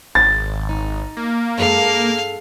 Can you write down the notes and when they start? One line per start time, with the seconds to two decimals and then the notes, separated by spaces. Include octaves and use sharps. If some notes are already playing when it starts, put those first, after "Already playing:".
0.15 G#1 A6
0.69 D#4
1.17 A#3
1.58 G2 G#3 A4 F5